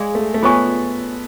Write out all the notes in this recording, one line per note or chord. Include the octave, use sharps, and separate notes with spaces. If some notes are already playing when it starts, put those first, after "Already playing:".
Already playing: G#3 G#4 D5 F5 G#5
A3
A3
B3 F4 G#4 C#5 G#5 C#6